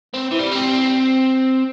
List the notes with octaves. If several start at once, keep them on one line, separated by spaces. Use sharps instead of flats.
C4
E3
G3
C4